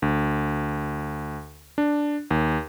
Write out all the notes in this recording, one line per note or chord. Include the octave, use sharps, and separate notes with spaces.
D2
D4
D#2